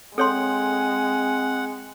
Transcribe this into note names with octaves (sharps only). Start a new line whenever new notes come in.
G#3 C4 A4 C#5 F#5 C6